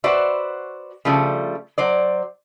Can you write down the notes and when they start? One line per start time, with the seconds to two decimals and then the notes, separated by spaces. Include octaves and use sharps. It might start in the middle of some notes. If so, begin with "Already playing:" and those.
0.04 F#4 B4 C5 D5 E5
1.05 C#3 F3 G3 A3
1.78 F#3 C5 D5